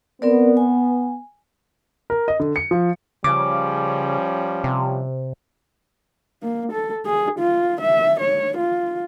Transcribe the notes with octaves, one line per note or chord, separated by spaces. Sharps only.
B3 C4 A#4 D5
G#5
A#4
D#5
D3
C#7
F3
C#3 F3 G3 C#4 D6
C3
A#3
A4
G#4
F4
E5
C#5
F4